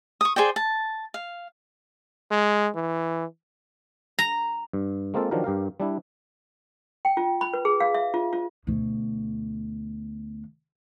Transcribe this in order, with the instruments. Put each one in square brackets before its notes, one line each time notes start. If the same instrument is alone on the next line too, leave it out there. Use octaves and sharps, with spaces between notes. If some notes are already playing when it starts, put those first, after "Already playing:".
[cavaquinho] C#6 D#6
G#4 C5 D5 G5
A5
F5
[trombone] G#3
E3
[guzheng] A#5
[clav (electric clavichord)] G2
G#3 A#3 C4 F4 A4
D#3 F3 F#3 D4 G4 A#4
G2 G4 A#4 F5
G3 D4 E4
[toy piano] G5
F4
B5
B4
G#4
F5
E5
F4
F4
[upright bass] D2 B2